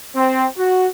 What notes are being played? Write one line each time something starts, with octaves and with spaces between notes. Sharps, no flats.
C4
F#4